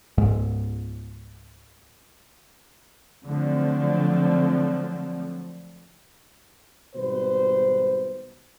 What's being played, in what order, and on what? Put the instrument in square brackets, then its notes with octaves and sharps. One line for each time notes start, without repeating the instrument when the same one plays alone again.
[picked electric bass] C#2 G#2 G#3
[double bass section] D3 F3 F#3 A3 C4
[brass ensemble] G#1 B2 G3 B4 C5